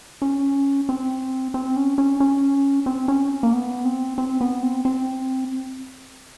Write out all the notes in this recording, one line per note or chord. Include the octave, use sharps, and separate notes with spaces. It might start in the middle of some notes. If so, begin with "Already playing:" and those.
C#4
C4
C4
C#4
C#4
C#4
C4
C#4
A#3
B3
C4
C4
B3
C4
C4